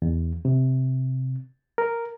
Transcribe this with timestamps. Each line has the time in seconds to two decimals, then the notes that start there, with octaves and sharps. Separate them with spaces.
0.02 E2
0.45 C3
1.78 A#4